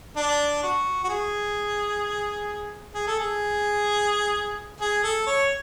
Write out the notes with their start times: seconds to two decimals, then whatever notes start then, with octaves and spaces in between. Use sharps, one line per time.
0.16 D4
0.63 F#4
1.04 F#4
1.09 G#4
2.94 G#4
3.07 A4
3.20 G#4
4.81 G#4
5.03 A4
5.26 C#5